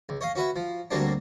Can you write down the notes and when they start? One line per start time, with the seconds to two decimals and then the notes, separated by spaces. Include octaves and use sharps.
0.09 C#2
0.21 C#5 D#5 F5
0.35 C#4 F#4 B4 E5
0.56 F3
0.91 D2 F#3 G3 A#3 C4 D4